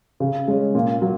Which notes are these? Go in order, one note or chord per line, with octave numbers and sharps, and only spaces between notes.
C#3
G#3 C#4
A#2
F#3